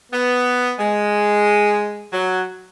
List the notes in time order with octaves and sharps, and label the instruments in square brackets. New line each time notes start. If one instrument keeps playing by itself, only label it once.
[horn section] B3
G#3
F#3